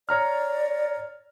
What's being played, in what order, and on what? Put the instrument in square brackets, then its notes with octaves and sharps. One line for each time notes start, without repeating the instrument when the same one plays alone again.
[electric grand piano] C#5 A#5 F6 [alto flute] D5